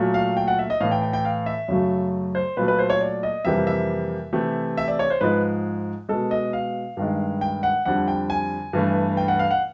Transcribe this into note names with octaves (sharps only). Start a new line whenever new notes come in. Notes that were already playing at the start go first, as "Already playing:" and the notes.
Already playing: A#2 F#3 A3
F5
G5
F#5
E5
D#5
A2 E3 A3 F5
G5
G5
G5
F5
E5
F#2 C#3 F#3 A3
C5
A#2 F#3 A3 B4
B4
C5
C#5
D5
D#5
F2 C3 E3 G3 A#3 E5
E5
C3 E3 A3
E5
D5
C#5
C5
G#2 F3 G#3 B4
B2 G#3 A4
D#5
F5
G2 D#3 G#3
G5
F#5
F2 D3 G3 F#5
G5
G#5
G2 E3 A3
G5
F#5
F5
F#5